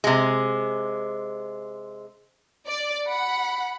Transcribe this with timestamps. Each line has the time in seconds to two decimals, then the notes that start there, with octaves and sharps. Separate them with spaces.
0.04 C3 G#3
2.67 D5
3.08 F#5 B5